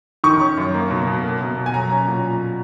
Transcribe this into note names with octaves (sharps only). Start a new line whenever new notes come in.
D#3 C#6
C#4
F#2
A#3
B2
B2
A#3
B2
B2
G#5
F#3 A#5
C#4
A#2